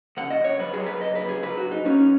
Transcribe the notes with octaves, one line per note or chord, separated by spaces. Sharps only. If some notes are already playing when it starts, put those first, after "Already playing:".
C#3 F#5
D#5
F#2
C#5
F#3 B4
G#4
F#3
B4
C#2 D#5
B4
C#2
G#4
F#3 B4
F#4
G#2
D#4
F#3 C#4